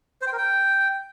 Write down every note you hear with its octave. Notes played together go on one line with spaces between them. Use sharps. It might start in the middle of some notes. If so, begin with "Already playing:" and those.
C5
G5
A#4
G5